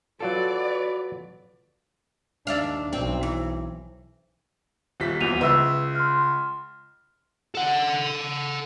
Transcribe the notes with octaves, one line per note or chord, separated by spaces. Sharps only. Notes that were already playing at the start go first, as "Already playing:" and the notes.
F#3 F4 F#4 A4 B4 D5
D#2 D4 D5 E5 F5
B1 C4
E3
D#1 B6
D1 E2 D#7 F7
C#2 B4 E5 E6
C6 F6
A4 F#5